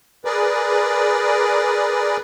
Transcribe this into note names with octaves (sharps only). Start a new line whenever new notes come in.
G#4 A#4 B4 D5